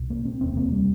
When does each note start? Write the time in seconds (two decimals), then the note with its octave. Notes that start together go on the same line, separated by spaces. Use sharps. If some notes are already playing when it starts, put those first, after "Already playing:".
Already playing: C2 A#2
0.10 A#3
0.25 C4
0.41 E1 D2 C3 C4
0.57 A#3
0.72 G3